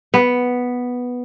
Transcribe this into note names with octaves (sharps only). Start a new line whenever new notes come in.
B3